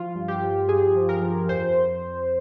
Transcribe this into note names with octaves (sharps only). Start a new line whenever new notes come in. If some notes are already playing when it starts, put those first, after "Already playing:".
Already playing: F3 F4
G2
G4
F3
G2 G#4
F3
A#4
F3
F2 C5